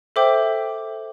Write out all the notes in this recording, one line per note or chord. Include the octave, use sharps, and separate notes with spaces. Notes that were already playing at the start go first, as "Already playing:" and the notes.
A4 C5 E5 G5 D6